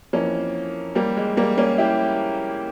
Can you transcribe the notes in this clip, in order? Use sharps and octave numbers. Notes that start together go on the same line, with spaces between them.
F2 E3 A#3 C#4
G3 A#3
G#3
G3 A#3
A#3 C#4
E4 G4